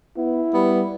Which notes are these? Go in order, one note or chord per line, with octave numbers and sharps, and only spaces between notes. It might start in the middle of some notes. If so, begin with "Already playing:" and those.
B3 E4
G3 B3